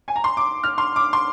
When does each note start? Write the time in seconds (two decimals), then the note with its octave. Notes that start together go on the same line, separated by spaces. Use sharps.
0.08 G#5
0.16 A#5
0.24 C6
0.37 D6
0.63 F6
0.78 C6
0.96 D6
1.13 C6